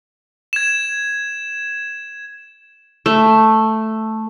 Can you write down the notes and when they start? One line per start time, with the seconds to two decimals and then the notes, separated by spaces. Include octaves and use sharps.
0.53 G#6 E7
3.06 A3